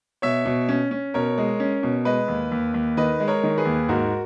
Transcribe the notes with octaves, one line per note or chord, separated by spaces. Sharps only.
B2 C#5 E5
B2
C#4
C#4
B2 A#4 C#5
G#3
C#4
B2
G#3 B4 D#5
D#2
D#2
D#2
D#3 B4 D#5
G#3
A#4 C#5
D#3
G#4 B4
D#2
G#2 F#4 A#4